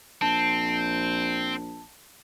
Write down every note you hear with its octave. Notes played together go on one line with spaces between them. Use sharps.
A#1 C4 A5